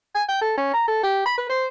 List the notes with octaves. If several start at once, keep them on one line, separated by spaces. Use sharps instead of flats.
G#5
G5
A4
C#4
A#5
A4
G4
B5
B4
C5